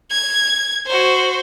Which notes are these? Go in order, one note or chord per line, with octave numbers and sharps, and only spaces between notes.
G#6
F#4 C5